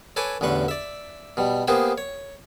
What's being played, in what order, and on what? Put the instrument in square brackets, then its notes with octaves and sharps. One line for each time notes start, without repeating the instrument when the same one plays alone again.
[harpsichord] A4 B4 C#5 G#5 D6
A1 E2 D3 B4 C#6
D5 E5
B2 G3
A#3 B3 G4 G#4 C5
C#5